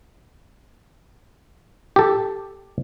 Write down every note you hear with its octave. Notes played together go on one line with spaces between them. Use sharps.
G4 A4